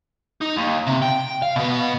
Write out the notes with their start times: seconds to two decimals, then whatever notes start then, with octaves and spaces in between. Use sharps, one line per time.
0.42 D#4
0.57 D#2
0.87 C3
1.02 G5
1.42 F5
1.56 B2 B3